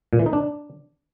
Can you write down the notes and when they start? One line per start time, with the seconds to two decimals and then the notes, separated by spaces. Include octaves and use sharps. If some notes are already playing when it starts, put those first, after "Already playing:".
0.13 A#2
0.19 E3
0.26 D#4
0.33 D4